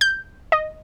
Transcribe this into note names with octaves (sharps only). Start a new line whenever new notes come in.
G6
D#5